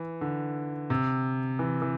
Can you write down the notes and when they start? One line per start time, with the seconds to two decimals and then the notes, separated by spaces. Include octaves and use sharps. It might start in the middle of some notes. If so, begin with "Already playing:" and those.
Already playing: E3
0.21 D3
0.90 C3
1.59 E3
1.82 E3